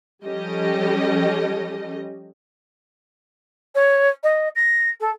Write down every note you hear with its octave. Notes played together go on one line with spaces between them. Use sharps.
F3 G3 C#4 G4 A4 D#5
C#5
D#5
A#6
A4